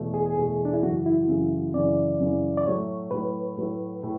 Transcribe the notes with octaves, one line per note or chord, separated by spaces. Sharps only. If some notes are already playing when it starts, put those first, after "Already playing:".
Already playing: E2 B2 A3
G#4
G#4
E2 B2 A3
D4
E4
F#2 C#3 E3 F#4
E4
F#2 C#3 E3
F#2 C#3 E3 D5
F#2 C#3 E3
D5
A2 F#3 A3 C#5
A2 F#3 A3 B4
A2 F#3 A3
A2